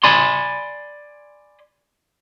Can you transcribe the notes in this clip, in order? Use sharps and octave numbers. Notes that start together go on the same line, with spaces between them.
D5 G#5 B5 C6